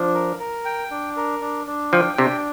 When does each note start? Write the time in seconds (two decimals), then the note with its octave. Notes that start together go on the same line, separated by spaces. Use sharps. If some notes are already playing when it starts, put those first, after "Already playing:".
Already playing: F3 D4
0.14 A#4
0.39 A#4
0.65 G5
0.91 D4
1.16 A#4
1.41 D4
1.67 D4
1.92 F3 G5
2.18 C3 D4